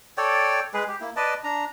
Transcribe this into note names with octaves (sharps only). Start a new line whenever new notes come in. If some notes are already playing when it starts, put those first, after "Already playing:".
A4 C#5 D5 G5
G#3 G#4 B4
G4
A#3 E4
B4 D5 D#5 A5
D4 A#5